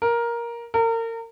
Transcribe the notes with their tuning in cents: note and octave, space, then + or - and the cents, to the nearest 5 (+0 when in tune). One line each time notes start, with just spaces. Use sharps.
A#4 +10
A#4 -35